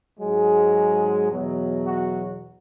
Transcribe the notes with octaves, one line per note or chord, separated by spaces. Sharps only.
G#2 F#3 G#3
E2 B2 F#3
F#4